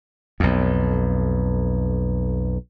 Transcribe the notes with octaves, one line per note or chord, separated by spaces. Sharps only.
B1 F2